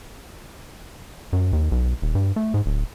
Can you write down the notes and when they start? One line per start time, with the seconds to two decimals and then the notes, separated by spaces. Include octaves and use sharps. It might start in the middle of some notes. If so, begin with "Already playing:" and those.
1.33 F#2
1.53 D#2
1.72 B1
2.02 D#1
2.15 G2
2.36 A3
2.54 G#2
2.66 D1